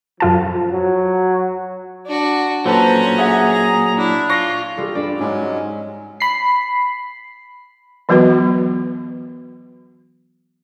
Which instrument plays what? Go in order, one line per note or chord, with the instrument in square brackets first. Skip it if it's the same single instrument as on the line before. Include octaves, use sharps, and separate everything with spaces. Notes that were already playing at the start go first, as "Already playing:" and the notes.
[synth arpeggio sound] F#2 F4 A5 [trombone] F3
[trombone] F#3
[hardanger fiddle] D4 F#4
[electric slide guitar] A#2 F#3 [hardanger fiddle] C#4 A#5 [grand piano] A4 B4 A5 [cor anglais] C5
[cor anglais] G#4 [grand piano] E5 F#5
[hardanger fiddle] A#5
[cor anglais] D4 [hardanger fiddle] E4
[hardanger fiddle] F4 [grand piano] C#6 A#6 C7
[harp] G3 F4 [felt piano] G#4 A4
[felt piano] G2 [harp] D5 B5 E6
[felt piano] G#2 [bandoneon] F#3 G#3 C#4
[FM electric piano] B5 C7
[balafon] E3 F#3 B3 F#4 B4